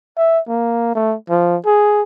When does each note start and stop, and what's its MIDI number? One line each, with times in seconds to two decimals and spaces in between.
0.17 0.39 76
0.48 0.93 58
0.95 1.16 57
1.29 1.57 53
1.66 2.03 68